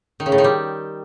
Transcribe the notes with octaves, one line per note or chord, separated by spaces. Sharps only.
D#3
C#3
A2
D#3
G3